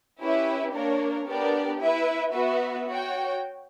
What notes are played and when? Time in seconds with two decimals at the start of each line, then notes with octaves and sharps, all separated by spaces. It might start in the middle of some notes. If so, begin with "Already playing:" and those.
0.21 C#4 E4 G4 B4 E5
0.74 A#3 D4 A#4 C#5
1.28 B3 D4 G4 A#4 D5
1.81 E4 B4 E5
2.34 B3 F#4 B4 E5
2.88 F#4 C#5 G5